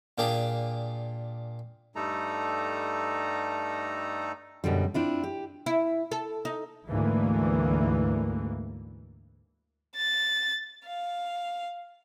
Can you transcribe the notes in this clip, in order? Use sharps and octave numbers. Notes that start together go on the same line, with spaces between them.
A#2 A#3 D4 G4 G#4
G2 G3 A3 D#4 A4 A#5
F#2 B2 D3 G3
C4 D4 E4 F4
G4
E4
A4
D#4
D2 G#2 E3 A#3
A6
F5